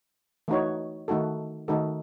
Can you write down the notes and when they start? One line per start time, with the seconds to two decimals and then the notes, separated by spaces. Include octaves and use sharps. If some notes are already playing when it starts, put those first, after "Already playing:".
0.48 E3 A3 D#4 F#4 C#5
1.08 D#3 A3 D#4 F#4 A4
1.68 D#3 A3 D#4 F#4 A4